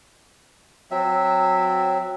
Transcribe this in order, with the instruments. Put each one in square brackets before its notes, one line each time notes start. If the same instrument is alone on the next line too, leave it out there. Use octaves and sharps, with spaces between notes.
[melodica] F#3 C4 E5